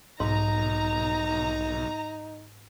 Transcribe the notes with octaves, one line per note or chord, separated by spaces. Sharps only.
B1 G#2 D#4 A#5